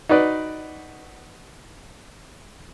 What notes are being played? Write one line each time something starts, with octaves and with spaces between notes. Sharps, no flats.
D#4 F#4 B4 D5